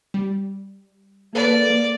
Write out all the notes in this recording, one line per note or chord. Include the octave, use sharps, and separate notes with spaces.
G3
A#3 A4 B4 D5 F5